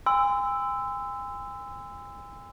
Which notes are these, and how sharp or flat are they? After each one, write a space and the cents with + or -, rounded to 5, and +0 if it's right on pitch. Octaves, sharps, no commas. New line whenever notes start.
G#5 -40 C6 -35 E6 +0